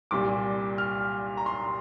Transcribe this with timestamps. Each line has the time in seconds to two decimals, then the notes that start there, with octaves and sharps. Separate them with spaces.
0.11 C2 A#2 G3 D6
0.78 F6
1.37 A#5
1.46 C6